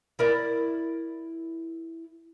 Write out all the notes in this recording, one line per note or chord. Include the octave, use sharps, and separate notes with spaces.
E4 A#4 D5